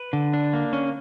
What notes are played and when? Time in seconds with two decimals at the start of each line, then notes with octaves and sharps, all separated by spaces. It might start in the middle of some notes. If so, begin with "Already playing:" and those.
Already playing: B4
0.13 D3
0.33 D4
0.53 A#3
0.73 C#4